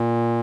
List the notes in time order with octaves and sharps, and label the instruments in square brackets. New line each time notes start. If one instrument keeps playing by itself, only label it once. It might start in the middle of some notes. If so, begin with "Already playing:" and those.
Already playing: [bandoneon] A#2